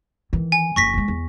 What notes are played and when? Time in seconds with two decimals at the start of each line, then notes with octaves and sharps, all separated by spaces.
0.33 D#3 E3
0.52 G#5
0.76 F#1 F2 C#6 A#6 B6
0.94 B2 G#3
1.08 E2